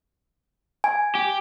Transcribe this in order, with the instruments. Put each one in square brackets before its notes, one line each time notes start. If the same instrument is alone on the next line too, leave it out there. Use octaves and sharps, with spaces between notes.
[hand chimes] G#5
[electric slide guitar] G4